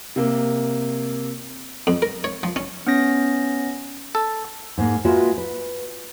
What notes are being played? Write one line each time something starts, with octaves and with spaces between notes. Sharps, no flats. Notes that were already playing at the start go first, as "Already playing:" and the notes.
C3 A#3
F2
A#4
C#5
F3
C#4
B3 C#4 A#6
A4
G#2 A#3
G#3 A#3 F4 F#4 B4 E5
B4